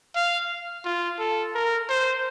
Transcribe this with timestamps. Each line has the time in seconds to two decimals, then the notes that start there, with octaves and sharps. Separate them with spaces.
0.15 F5
0.85 F4
1.19 A4
1.54 A#4
1.89 C5